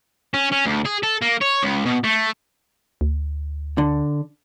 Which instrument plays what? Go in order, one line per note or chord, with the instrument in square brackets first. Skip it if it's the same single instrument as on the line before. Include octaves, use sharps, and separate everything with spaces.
[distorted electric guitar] C#4
C#4
D2
G#4
A4
A#3
C#5
C#2
B2
A3
[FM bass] D2
[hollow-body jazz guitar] D3